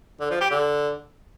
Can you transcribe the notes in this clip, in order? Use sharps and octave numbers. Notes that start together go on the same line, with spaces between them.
D3
F3
G4
D3